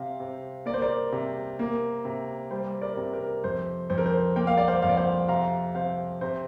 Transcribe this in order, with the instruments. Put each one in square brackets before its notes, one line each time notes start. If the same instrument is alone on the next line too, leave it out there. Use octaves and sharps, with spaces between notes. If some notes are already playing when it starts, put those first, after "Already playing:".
Already playing: [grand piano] C3 C5 F5
C3
A#3 D5
C5
A#4 D5
C3
A#3
C3
G3 C5
A#4 D5
C3
A#4
F2 C5
F2 C5
A#4
C5
A#3 G5
F5
D5
C5 F5
F2 F5
D5
C5 F5
C3 F5 A#5
C3 C5 F5
C3 C5